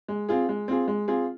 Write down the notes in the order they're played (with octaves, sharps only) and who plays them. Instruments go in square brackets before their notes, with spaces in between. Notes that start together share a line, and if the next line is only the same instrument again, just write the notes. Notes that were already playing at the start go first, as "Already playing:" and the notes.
[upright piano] G#3
C4 F4 G#4
G#3
C4 F4 G#4
G#3
C4 F4 G#4